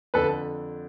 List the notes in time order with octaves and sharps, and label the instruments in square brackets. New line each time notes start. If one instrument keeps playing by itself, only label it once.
[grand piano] F2 D3 A4 B4